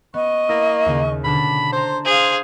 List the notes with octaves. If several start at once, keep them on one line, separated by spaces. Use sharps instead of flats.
B3 D#5 C#6
A#3 E4 D#6 A#6
D#2 C#3 D#7
B2 D3 D4 A5 B5
C5 A#5 C6
G#4 C5 F5